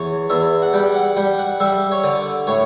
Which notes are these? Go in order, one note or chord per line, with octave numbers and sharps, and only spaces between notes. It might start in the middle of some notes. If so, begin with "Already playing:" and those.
Already playing: E2 C#5
E2 E5
F#5
G3 G5
F#5
G3 G5
F#5
G3 E5
C#5
D3 D5
A2 C#5